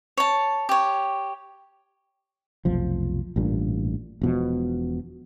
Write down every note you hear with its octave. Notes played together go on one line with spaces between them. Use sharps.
C#5 A5
G4 C#5
F1 B1 F3
A1 G2 A#2
E1 B2 F3